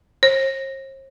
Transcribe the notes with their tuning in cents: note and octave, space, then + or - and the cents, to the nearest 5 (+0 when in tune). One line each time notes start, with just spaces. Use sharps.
C5 +45